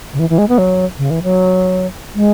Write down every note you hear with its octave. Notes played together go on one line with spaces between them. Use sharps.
C#3
E3
E3
G#3
B3
F#3
C#3
E3
F#3
G#3